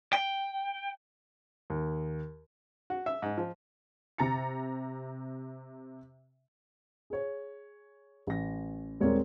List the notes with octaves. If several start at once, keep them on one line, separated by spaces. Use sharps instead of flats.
G5
D#2
F#4
E5
G#2
F3
C3 A#5 A6 C#7
G#4 C#5
A1 A#6
D#1 G#3 C4 A#4 C#5 D5